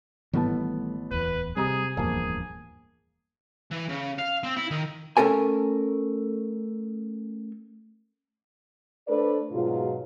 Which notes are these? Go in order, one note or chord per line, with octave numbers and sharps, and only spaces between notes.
A1 D#3 G3 A3 B3 A5
D1 E2 B4
C3 G3 G#4 A#5 D#6
D1 E2 G2 F3 A#3 G#4 A5
E3
C#3
F5
C4
E4
D#3
A3 C#4 A4 A#4 G#5
A3 D4 A4 B4 C5 D5
G#2 B2 F#3 F4